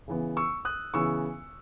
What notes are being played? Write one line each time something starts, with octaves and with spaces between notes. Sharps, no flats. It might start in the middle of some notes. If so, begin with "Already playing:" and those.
C#3 E3 B3
C#6 E6
D#6 F#6
C#3 E3 B3 C#6 E6